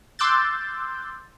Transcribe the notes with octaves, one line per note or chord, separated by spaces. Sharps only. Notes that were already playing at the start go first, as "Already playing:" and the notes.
C6 D6 E6 F#6 G6 A6